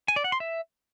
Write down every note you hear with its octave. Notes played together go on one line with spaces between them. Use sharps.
G#5
D5
F#5
C6
E5